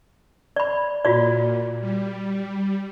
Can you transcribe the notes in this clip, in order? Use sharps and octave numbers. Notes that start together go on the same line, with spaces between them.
D5 B5
A#2 F4 F#4 D5
G3